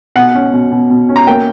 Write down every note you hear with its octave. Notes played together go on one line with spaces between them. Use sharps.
B2 F#5
C#4
B2
B2
B2
C#4
A#5
A#3 G5